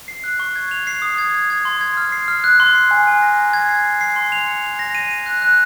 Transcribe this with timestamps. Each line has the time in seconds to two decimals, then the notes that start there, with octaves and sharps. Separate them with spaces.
0.08 C7
0.24 F#6
0.40 C#6
0.56 G#6
0.71 F7
0.87 C7
1.02 D#6
1.18 G#6
1.34 G#6
1.50 G#6
1.65 C6
1.81 G#6
1.97 F6
2.12 C7
2.28 F6
2.44 F#6
2.60 C6
2.75 C7
2.91 G#5
3.07 G#5
3.22 A#6
3.38 A#5
3.53 G#6
3.69 C7
3.85 C7
4.01 C7
4.16 C6
4.32 F7
4.47 C#7
4.63 F7
4.79 A#6
4.95 D#7
5.11 D#7
5.26 F#6
5.42 F#6